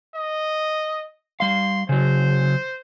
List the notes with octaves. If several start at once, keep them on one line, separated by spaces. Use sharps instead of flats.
D#5
G3 F5 C6
C#3 F#3 C5